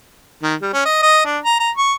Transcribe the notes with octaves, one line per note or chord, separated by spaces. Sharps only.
D#3
G3
C#4
D#5
D#5
D4
A#5
A#5
C#6